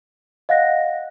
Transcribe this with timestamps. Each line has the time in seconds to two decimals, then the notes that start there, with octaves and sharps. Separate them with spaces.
0.49 D#5 F5 F#5 F#6 A#6